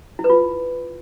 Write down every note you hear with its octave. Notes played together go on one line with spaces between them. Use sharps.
E4
B4
F4